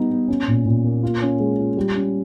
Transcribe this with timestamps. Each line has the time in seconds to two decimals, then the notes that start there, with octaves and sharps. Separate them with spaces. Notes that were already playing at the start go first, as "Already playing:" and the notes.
Already playing: G3 B3 D#4
0.11 B3
0.28 C#4
0.48 A#2
0.65 A#2
0.84 A#3
1.03 F4
1.22 C#4
1.40 G#3
1.58 F4
1.77 G3
1.95 C#4